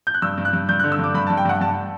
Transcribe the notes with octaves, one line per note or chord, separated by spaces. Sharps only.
G6
F#6
G2 E6
G2
F#6
G2
G2 G6
F#6
D3
E6
G2 D6
G2 B5
A5
G2
G5
G2 F#5
G2 A5